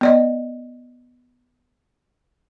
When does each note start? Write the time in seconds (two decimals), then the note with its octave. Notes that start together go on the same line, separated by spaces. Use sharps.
0.01 B3 D5 D#5